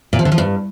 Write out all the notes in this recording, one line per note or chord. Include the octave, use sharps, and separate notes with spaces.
A#2
F3
D3
F3
G2